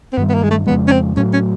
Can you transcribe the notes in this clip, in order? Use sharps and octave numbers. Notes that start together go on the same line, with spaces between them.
C4
G2 D#3 G3 B3
B3
A#3
G#3
A3
F2 C#3 F3 G#3 B3
C#4
C4
A2 F#3 A3 C#4
C#4